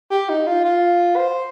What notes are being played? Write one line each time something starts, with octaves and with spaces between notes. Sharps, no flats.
G4
D#4
F4
F4
C5